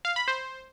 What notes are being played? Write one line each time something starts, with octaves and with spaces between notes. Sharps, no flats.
F5
B5
C5